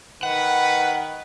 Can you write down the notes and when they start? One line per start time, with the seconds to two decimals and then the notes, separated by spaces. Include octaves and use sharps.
0.23 D#3 B4 F#5